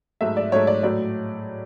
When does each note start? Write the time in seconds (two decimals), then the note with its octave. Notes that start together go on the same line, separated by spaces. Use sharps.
0.21 G#2 F#3 A3 E5
0.37 D5
0.52 G#2 F#3 A3 C#5
0.67 D5
0.83 A2 F#3 A3 D5